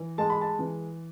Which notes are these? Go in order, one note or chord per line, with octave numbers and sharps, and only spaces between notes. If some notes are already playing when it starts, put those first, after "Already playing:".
Already playing: E3
G#3 A5
B5
A5
E3